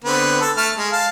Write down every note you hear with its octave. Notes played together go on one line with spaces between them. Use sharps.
D3 B3 C4
A4
A3 A5 F6
G#3
F5 A5